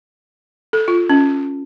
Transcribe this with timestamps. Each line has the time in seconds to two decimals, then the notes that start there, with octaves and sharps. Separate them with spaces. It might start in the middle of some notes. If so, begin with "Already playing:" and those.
0.73 A4
0.88 F4
1.10 C#4